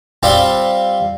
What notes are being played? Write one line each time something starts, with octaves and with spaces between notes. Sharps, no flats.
G3 C4 F4 G4 D5